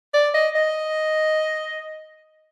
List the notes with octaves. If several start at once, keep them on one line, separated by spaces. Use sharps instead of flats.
D5
D#5
D#5